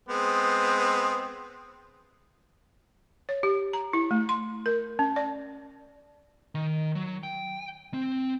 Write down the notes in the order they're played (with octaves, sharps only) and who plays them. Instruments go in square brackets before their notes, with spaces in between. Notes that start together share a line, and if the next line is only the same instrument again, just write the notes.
[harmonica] G#3 B3 C4
[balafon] C#5
G4
A#5
E4
A3
C6
A#4
C#4
D5
[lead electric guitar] D#3
F#3
G5
C4